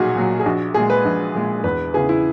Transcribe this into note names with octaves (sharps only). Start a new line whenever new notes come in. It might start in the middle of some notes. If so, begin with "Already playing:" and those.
Already playing: B1 A#2 F#3 F#4 G#4
A#2 F#3
G#4
A#1 F#4
A#2 G#3 G#4
B4
A#1
A#2 G#3
E2 B4
C#3 E3 B3 G#4
E4